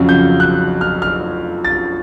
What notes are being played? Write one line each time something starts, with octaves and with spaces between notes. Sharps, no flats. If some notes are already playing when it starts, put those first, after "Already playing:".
Already playing: F2 C#3 F#3
G6
F#6
F6
F6
A6